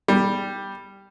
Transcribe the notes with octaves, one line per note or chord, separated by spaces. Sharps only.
G3